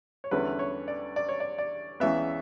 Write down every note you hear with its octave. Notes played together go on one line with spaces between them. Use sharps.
C#5
E2 D3 G3 C#4 E4 B4
C#5
D5
D5
C#5
D5
D5
C#2 C#3 E3 B3 E5